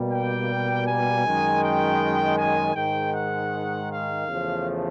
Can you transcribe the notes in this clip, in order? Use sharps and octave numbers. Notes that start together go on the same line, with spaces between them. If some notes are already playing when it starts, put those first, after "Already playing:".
Already playing: B2 G3 A#3
G5
G#5
F#2 D#3 G#3
G5
G#5
G#2 D#3 G#3 G5
F#5
F5
E2 C#3 F3 A3